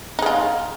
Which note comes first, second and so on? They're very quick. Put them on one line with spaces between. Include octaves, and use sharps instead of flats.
D#4 G#4 F4